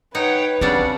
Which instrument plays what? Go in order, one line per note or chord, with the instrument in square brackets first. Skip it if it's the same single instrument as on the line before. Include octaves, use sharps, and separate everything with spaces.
[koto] D#4 [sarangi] B4 [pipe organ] C#5 F#5 G5
[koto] C#3 G3 D4 [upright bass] C4 [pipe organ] F#5